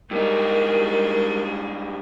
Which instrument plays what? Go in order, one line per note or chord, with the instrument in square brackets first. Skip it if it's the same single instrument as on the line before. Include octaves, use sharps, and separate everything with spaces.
[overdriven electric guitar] G2 D#4 [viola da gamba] G3 G#3 G#4 [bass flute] A#4